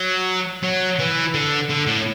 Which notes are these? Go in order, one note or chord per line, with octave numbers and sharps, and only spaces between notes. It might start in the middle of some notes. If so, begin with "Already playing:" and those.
Already playing: F#3
F#3
E3
D3
D3
A2